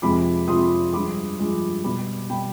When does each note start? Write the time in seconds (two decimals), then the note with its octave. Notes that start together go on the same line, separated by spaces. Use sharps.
0.02 F2 C3 F3 G#3 B5 D6
0.48 F2 C3 F3 G#3 C6 D#6
0.93 G2 F3 G#3 B5 D6
1.40 G2 F3 G#3
1.84 B2 G3 B5 D6
2.30 B2 G3 G5 B5